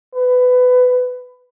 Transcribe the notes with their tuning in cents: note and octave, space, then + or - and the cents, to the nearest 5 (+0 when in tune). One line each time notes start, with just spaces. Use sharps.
B4 +20